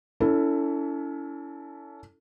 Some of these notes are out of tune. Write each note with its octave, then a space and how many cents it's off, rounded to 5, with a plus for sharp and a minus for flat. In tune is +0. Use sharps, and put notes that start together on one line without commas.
C#4 +40 E4 +0 A4 +20